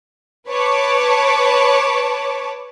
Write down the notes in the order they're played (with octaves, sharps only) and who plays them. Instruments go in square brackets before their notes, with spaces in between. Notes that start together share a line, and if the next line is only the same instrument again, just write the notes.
[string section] B4 C#5 A5 D6